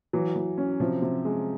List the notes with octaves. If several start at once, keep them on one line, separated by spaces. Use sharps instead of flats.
E3 F#3
E3
C#4
C3 F3
C3
G#3